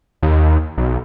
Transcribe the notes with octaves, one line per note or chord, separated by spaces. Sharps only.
D#2
B1